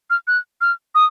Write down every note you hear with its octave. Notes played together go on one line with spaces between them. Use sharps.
F6
F#6
F6
D#6